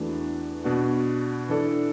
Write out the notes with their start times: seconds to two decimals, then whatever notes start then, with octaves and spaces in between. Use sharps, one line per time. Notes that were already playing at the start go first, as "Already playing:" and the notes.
Already playing: E2 E3 A3 D4 F#4
0.64 B2 B3 D4 F#4
1.49 E3 D4 A4 D5